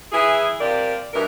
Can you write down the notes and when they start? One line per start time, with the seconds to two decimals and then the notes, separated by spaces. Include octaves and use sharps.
0.12 E3 E4 G#4
0.60 C3 F4 G4 A#4 D5
1.13 G2 B2 E3 A#4